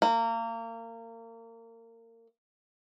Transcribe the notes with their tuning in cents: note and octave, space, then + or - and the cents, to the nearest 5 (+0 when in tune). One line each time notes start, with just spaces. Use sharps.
A#3 -30